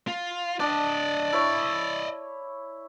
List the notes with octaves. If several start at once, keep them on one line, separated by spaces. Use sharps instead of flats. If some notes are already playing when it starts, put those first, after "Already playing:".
F4
D4 D5 D#5
E4 C#5